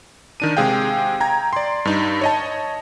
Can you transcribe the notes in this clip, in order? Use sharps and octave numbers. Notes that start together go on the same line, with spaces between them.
D#3 D4 D#7
C3 G#3 G#4 F5 G5
G5 A#5 G#6
D5 C6
G2 D#4
C#5 D#5 A5